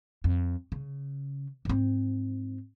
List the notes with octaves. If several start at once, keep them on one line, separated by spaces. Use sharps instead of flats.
F2
C#3
G#2 C4